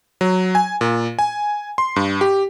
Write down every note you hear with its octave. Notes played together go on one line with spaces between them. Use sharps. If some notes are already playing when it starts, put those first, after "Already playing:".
F#3
G#5
A#2
G#5
C6
G2
G4